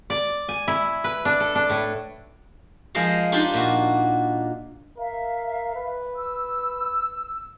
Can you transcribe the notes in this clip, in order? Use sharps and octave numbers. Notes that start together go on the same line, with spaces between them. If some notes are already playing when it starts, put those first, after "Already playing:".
D5
G#5
E4
B4
D4
A4
D4
A2
F3 G#3 A#4 D#5 F5
D4 D#4 F4 G4
A#2 F#4
A#4 E5 F5
B4
E6